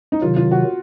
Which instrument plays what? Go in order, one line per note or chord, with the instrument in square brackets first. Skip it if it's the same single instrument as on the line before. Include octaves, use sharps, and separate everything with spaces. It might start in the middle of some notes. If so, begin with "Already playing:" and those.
[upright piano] D#4
[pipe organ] C3 D#3 F#3 [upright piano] F4
[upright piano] F4
F#4